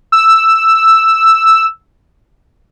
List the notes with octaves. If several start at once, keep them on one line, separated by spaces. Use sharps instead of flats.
E6